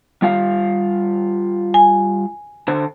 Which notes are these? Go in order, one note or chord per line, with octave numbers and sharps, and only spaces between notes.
G3 F4 F5
G#5
D3 C5